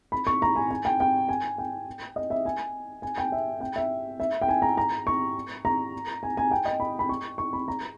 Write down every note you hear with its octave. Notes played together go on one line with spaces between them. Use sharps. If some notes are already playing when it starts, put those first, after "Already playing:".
B5
C#6
A#5
G#5
G#5
G5
G5
G#5
G5
D#5
E5
G#5
G#5
G5
E5
G5
E5
E5
G5
G#5
A#5
A#5
C#6
A#5
G#5
G#5
G5
D#5
B5
B5
C#6
C#6
B5
A#5